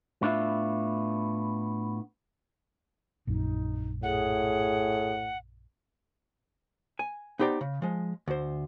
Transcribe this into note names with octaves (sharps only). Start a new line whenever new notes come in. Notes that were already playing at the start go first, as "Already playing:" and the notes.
A2 B3 D4 F4 E5
A#1 F#2 D#4
A2 G#4 F#5
G#5
B3 D#4 G4 C5 D5 A#5
C#3
F3 G#3
D2 C5